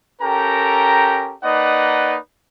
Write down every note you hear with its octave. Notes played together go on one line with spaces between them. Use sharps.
C#4 G4 A4 A#4 G5 A#5
A#3 D#4 B4 D5 D#5 F#5